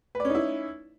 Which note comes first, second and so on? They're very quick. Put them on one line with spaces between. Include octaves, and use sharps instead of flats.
B4 D5 C#4 D#4 E4